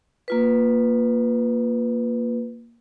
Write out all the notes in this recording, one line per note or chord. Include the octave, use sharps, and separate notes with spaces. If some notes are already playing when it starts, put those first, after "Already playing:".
A#3 F4 B4